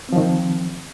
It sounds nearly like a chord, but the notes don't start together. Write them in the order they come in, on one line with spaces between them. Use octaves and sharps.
C4 F3 D#3